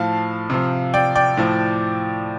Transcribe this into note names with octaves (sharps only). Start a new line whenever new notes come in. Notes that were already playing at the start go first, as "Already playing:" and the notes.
Already playing: A2 F3 F5 A5
C3 F3
D5 G5
D5 G5
A2 F3